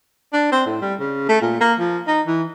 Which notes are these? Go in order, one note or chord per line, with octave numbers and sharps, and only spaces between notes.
D4
C4
A2
G3
C#3
A3
A#2
A#3
F3
D#4
E3